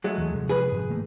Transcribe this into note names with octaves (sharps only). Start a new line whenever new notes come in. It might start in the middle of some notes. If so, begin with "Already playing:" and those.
F#3 G#3 A3
D#2 E3
C3 F3 G#3
G#4 B4
G#2 C3 F3
D#3 A3 A#3